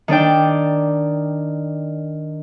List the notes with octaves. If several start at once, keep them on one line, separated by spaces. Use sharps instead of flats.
D#3 D4 D5 G5